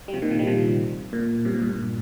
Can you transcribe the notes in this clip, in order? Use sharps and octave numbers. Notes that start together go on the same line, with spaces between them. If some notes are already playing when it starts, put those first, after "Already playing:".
G3
C3 F3
A#2 D#3
C3 F3
D#3 G3
C3 F3
A#2
G2 C3
A#2
G2
A#2